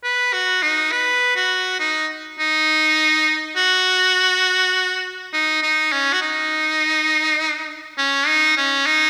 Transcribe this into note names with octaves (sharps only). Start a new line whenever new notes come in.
B4
F#4
D#4
B4
F#4
D#4
D#4
F#4
D#4
D#4
C#4
F#4
D#4
C#4
D#4
C#4
D#4